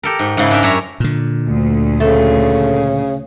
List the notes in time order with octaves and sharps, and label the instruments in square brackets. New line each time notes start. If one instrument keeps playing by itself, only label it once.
[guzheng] G4 A4 A#4
G#2
G#2 C#3 E4
D4 A#4 E5 G5
F#2 G4 C#5 E5 A#5
[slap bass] A#2 D3
[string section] D2
[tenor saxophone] C#3 [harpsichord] A3